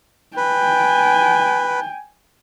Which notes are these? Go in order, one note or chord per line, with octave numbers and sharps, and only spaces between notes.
B4 G5 G#5